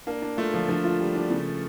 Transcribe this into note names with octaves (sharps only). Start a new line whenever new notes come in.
A#3 D4
D4
A3 F4
D3 F3
D3 F3
F4
G3
D4
C#3